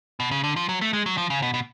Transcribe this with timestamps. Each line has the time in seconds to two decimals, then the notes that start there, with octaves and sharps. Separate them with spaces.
0.20 B2
0.31 C#3
0.44 D3
0.56 F3
0.69 F#3
0.81 A3
0.93 G#3
1.06 F#3
1.18 F3
1.30 C#3
1.42 B2
1.54 B2